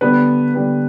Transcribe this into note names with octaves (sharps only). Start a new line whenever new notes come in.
D3 G3 B3 B4
D3 G3 B3